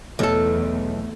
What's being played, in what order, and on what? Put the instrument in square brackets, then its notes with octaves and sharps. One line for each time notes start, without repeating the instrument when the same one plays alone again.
[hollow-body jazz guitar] B1 A4 [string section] E2 [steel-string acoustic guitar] A3